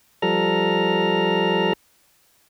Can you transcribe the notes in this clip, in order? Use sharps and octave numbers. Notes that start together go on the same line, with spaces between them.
F3 G3 A4 A#5 F6